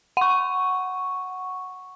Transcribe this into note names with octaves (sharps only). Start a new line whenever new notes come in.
F#5 C#6